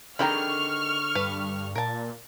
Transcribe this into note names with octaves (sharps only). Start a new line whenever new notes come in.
D3 D#3 G#4 G5 A#5 B5 C#6 F6
G2 B4
A#2 A#4 A5